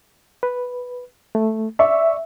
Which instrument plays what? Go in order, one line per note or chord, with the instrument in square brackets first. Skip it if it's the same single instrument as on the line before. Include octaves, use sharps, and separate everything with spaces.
[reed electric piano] B4
A3
[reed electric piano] D5 C#6 [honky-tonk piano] E5